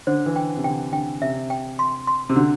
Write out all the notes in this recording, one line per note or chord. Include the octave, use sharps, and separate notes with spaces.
D3 C5
E3
G5
C3
D3 G5
D3 G5
C3 E5
G5
C6
C6
C3
D3 F#4